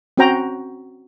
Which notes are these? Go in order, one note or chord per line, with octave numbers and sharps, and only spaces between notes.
C4 C#4 F#4 C5 G5 A#5